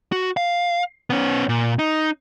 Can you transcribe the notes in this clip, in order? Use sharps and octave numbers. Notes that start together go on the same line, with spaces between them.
F#4
F5
B3 C#4
A#2
D#4